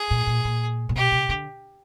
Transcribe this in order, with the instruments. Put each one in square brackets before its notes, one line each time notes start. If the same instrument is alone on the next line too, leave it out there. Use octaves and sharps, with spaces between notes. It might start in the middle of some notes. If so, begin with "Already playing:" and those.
Already playing: [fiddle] G#4
[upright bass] A#2
A#2
A#2
A#2
[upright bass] B2 [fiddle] G4
[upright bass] C3
D3